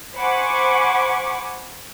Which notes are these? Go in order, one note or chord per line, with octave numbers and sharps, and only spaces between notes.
C5 F#5 G#5 B5 C#6 D6